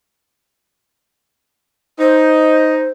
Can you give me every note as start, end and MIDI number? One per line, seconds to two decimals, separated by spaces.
1.99 2.87 63
1.99 2.89 72